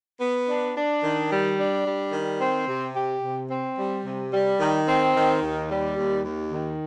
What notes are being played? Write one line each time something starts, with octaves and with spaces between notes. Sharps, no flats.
B3
D4
D4
D#3
G3
D4
G3
D#3
C4
C3
G4
C3
C4
G3
C3
G3
D#3
C4
D#3
D#2
G3
D#2
D#2
D#3